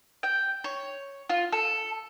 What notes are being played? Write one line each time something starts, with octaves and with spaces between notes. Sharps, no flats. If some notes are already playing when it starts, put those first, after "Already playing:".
G5
C#5
F4
A4